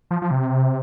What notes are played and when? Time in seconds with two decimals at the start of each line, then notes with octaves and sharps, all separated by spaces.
0.11 F3
0.22 F3
0.31 C3